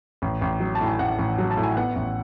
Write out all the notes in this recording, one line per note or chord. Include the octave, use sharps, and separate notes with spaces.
A1
A1
F#3
A5
A2
G#5
A1 F#5
A1
F#3
A5
A2
G#5
B3 F#5
A1